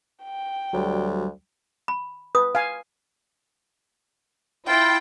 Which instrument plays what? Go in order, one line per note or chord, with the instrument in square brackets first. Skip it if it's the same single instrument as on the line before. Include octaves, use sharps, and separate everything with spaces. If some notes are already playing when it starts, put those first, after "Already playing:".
[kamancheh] G5
[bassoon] D2 [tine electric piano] F#3 G3
[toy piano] B5
[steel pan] B4 [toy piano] D#6
[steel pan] F5 G#5
[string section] E4 G5 [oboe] F4